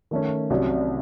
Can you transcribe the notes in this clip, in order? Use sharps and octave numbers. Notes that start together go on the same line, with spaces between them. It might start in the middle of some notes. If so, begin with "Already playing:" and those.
D#3 A3 C#4
C2 C3 F#3 C#4